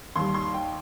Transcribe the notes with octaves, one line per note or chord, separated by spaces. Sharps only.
D#2 D#3 G3 C6
C6
G5